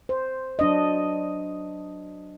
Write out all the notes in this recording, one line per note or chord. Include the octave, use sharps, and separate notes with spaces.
C5
F#3 D4 D#5